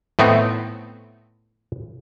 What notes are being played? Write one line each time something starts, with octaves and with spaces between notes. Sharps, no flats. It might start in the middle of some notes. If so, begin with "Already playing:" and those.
A2 A3 B3 C4 D#4